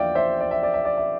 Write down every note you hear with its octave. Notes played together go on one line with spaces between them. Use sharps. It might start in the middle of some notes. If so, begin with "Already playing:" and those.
Already playing: E2 D3 F3 A#3 D5 E5 F5 G5
C5 E5
D5
E5
D5
E5
D5
E5